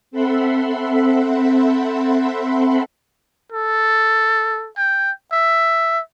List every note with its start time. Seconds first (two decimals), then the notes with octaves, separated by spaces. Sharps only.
0.11 C4 A4 E5 F#5 B5 C6
3.52 A4
4.77 G5
5.32 E5